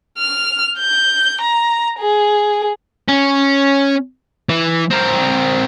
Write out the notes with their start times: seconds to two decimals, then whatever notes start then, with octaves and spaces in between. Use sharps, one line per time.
0.19 F6
0.79 G6
1.41 A#5
1.99 G#4
3.08 C#4
4.49 E3
4.90 C4 A#4